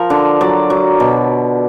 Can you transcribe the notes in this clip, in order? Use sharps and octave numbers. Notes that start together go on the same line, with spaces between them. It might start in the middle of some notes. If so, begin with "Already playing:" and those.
Already playing: F3 A#4
D3
F#3 D5
F#3
B2